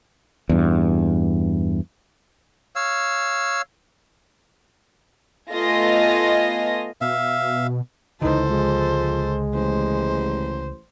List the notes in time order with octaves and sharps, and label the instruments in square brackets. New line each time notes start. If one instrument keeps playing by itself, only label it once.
[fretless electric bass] E2 G2
[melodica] C#5 F5 E6
[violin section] A3 B3 F4 D#5 G#5 A#6
[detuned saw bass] B2 [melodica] E5 F5
[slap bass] C#2 D3 [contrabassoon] E3 [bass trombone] D#4 [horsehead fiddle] A4 C5
[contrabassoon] F3 [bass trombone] G#3
[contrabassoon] A1 [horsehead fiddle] C5